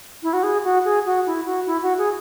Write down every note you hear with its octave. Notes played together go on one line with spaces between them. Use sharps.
E4
F#4
G#4
F#4
G#4
F#4
E4
F#4
E4
F#4
G#4